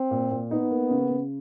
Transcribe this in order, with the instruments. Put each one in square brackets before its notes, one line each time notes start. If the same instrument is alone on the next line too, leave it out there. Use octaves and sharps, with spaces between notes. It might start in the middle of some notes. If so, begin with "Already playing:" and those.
Already playing: [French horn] C4
[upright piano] A#2
A#2
[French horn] B3 [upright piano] D#4
[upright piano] A#3
C#3
C#3